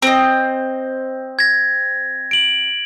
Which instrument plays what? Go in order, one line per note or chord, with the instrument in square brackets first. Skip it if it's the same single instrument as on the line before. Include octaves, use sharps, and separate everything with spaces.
[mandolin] C4 D#5
[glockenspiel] G#6 A#6
D7 F#7